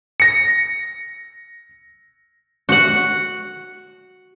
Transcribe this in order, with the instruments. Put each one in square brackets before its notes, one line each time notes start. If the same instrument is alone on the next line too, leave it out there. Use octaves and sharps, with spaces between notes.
[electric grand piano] A#6 C#7
[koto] F#4 F#5